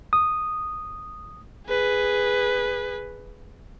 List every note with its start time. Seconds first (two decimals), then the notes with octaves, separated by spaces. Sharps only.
0.13 D#6
1.67 G#4 B4